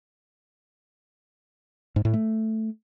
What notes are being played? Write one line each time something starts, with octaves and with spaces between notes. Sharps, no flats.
G#2
A2
A3